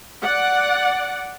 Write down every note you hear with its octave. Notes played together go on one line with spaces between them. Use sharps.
D5 F#5